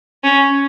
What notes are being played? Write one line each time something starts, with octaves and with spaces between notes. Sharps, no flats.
C#4